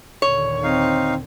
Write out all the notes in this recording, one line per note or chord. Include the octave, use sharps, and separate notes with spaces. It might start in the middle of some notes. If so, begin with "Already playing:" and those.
D#2 A#2 D3 C#5
C4 D#4 F5